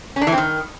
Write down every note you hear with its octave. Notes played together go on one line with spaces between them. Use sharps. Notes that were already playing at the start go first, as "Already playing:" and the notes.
C#4
D4
E3
C4
D#3